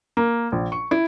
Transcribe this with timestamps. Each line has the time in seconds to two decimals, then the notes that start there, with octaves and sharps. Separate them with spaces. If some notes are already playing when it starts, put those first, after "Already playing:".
0.17 A#3
0.52 A#1
0.72 C#6
0.91 E4